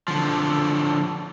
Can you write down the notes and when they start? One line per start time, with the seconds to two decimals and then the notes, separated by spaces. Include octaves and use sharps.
0.08 D3 F3